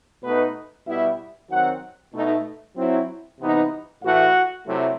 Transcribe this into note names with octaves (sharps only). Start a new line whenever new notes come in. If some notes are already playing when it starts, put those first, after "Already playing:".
B2 A3 B3 D#4 B4
B2 G3 B3 E4 E5
D#3 F#3 C4 F#4 F#5
B2 A3 D#4
F#3 C4 E4
C3 E3 B3 D#4
A2 E3 A3 E4 F#4 F#5
C3 F#3 A3 E4